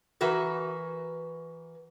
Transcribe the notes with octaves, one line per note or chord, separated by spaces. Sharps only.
E3 F#4 A#4 B4